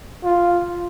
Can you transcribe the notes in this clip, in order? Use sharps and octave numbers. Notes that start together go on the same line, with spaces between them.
F4